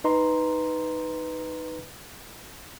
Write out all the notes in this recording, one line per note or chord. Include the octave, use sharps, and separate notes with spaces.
D#4 B4 D#5 A#5 C6